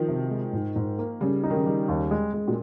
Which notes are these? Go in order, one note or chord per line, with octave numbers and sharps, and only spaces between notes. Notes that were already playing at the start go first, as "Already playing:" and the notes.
Already playing: D#3 F3
C3
G#3
G#2
G#2
A#3
C#3 G3
D#4
D#3
C#3
G3
D#2
G#3
G#3
A#2